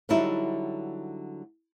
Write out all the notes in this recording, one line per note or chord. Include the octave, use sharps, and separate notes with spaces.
D3 F#3 G3 D#4 E4